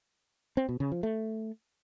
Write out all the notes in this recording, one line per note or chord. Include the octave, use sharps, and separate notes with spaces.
C4
B2
C#3
F3
A3